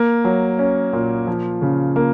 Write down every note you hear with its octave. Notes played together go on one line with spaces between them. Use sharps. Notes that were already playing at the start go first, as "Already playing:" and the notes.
Already playing: A#3
F#3
C#4
A#2
F3
C#3
A#3